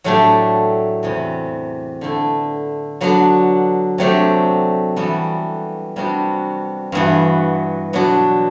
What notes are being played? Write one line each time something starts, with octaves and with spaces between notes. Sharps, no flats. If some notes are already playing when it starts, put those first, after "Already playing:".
A2 F#3 A3 D4 G4
E2 C3 E3
D3 A3 E4
D3 F#3 B3 D4 F#4
C3 F#3 A3 D4 G4
E3 G3 B3 F#4 A4
C3 G3 B3 D4 F#4
G2 E3 B3 F#4
B2 F#3 B3 D4 F#4